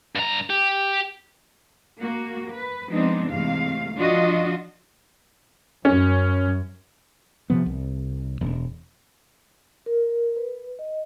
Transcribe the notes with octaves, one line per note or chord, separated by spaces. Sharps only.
G2 A#5
G4
A#3 F#4
B4
F3 G#3 B3 C4 D4 D#4
E2 G#2 C3 A3 F5
F3 D4 F4 F#4 D#5
F#2 C#4
C3 F3 B3
C2
E1
A#4
B4
D#5